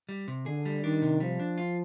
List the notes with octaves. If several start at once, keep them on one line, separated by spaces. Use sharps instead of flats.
G3
C3
D3 G#4
G3
D#3 D4
C3
F3 G3
D4
F4